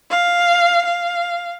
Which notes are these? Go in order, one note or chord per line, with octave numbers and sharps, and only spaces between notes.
F5
F5